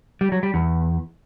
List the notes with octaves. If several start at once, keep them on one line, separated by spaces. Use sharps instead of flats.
G3
F#3
G3
E2